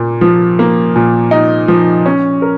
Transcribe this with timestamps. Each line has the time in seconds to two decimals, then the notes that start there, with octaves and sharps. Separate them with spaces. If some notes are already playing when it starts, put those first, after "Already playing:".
Already playing: A#2 A#3
0.21 F3
0.59 A#3
0.96 A#2
1.31 D#4
1.68 F3
2.06 C#4
2.42 A#4